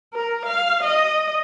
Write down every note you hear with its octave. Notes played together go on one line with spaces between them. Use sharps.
A#4
F5
D#5